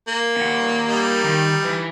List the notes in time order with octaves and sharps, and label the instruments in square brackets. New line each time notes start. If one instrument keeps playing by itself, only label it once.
[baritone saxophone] A#3
[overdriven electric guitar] A#2 F#5
[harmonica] G3 D#4
[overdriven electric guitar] D#3
E3 E4